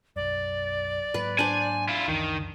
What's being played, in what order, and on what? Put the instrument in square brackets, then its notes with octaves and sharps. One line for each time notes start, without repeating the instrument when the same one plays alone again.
[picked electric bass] B1 F#2 [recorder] D5
[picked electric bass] G#2 F#3 A#3 [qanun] B4
[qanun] D4 C5 [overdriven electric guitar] G#5
[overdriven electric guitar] E4 F4
[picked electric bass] C#2 F#2 E3 [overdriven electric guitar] D#3